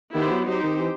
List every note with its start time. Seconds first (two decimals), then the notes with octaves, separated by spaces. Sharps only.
0.14 D#3 B3 E4 G4 C5
0.31 F#3
0.46 F#3 C4 D#4 G4 C5
0.63 D#3
0.79 E3